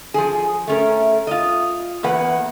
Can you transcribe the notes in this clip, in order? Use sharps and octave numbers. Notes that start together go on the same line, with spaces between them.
F3 G#4
A3 C#4 A#4
F4 D#5
E2 A#3 B4 F#5